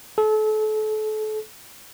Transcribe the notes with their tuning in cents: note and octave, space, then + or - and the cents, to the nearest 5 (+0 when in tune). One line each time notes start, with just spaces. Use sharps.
A4 -35